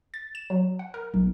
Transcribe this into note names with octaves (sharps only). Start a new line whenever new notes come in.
A6
E7
F#3
F#5
A#4
B1